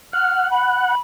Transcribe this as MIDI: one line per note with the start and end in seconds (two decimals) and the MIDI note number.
0.13 0.95 78
0.13 0.49 89
0.51 0.85 83
0.88 0.98 83